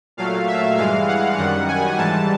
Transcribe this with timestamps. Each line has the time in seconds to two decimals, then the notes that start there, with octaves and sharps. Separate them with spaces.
0.17 A#2 F#3 A3 F5
0.47 E5
0.77 G2 E3 G#3 F5
1.07 F#5
1.37 F#2 D#3 G3 F#5
1.68 G#5
1.98 G#2 E3 G3 A5